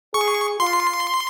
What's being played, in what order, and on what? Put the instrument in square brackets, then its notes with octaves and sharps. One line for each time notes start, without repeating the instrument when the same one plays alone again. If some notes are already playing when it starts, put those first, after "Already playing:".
[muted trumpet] G#4 [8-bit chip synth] C#6
[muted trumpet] F4 [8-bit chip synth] C6